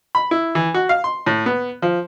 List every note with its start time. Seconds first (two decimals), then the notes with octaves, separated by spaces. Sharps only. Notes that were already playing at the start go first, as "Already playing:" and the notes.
0.15 B5
0.31 E4
0.55 E3
0.74 F#4
0.89 F5
1.04 C6
1.26 A2
1.46 B3
1.82 F3